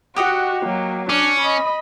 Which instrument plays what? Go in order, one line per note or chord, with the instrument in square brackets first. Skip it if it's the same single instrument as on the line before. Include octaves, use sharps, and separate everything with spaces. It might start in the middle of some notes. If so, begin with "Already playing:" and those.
[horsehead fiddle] F#4 [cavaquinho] G4 D#5 F#5
[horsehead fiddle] F#3 A#3
[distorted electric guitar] C#4 [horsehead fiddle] D4 [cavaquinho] D6
[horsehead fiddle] D#5 B5